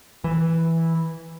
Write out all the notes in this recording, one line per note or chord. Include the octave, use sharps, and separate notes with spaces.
E3